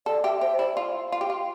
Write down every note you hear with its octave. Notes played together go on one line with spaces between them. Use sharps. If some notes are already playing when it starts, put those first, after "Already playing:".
A4 D5
G4 E5
G4 C5
E4 D5
F4
F4
G4
F4